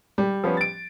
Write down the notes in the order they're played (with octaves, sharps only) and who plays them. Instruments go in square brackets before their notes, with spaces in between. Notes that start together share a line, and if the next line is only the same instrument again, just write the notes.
[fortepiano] G3
[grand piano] F3 B3 C#4
A6 D7